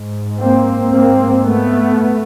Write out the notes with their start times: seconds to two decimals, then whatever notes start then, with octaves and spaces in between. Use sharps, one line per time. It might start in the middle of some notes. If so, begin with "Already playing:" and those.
Already playing: G#2
0.40 A#3 C4
0.92 G#2 A#3 C4
1.45 A3 B3